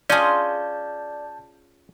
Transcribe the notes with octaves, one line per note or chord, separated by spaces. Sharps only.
C#4 F4 G#4 D5 D#5 A5 G6